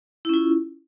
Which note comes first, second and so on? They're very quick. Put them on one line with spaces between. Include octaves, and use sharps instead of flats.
E4 C#4 F4